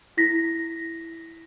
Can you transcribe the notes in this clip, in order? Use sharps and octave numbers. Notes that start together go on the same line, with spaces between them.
E4 A#6 B6